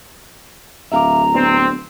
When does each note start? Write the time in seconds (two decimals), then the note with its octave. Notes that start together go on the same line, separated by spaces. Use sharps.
0.92 D1 E5 F5 A#5 D6
1.35 B3 C4 D4